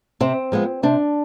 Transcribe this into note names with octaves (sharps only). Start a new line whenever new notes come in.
C3 C4
F3 G#3 B3
C3 D4